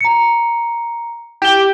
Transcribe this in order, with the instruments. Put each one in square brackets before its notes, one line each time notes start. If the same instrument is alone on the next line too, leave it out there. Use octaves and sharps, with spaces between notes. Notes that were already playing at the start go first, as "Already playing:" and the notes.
[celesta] A#5 C#7
[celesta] E4 E7 G7 [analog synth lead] G4